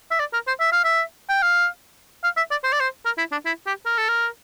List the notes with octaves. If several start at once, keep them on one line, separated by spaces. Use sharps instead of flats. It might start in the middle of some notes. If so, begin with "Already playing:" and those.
E5
D5
A#4
C5
E5
F5
E5
G5
F5
F5
E5
D5
C5
D5
C5
A#4
E4
D4
E4
G4
A#4
A4
A#4